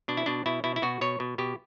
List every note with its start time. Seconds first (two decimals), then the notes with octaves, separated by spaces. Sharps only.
0.08 B2 D4
0.17 E4
0.26 B2 D4
0.46 B2 E4
0.64 B2 E4
0.76 E4
0.82 B2 F#4
1.01 B2 C#5
1.20 B2
1.38 B2 G4